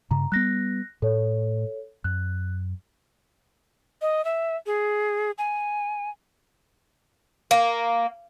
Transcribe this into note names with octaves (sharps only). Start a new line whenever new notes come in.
G2 C#3 A#5
G3 B3 F#6 A#6
A2 A4 C#5
F#2 F#6
D#5
E5
G#4
G#5
A#3